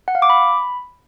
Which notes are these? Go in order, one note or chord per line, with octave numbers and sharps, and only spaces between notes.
F#5
F5
D6
B5